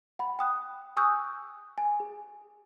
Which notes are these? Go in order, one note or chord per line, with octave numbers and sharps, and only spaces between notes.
F#5 B5
G5 D#6 F#6
G#5 C#6 D#6 E6 F#6 G6
G#5
G#4